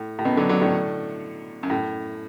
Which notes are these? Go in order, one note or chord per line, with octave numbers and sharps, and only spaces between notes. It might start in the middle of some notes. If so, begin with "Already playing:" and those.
Already playing: A2
A2
F#2 B2
D3 F#3
D3 F#3
A2 D3
F#2
A2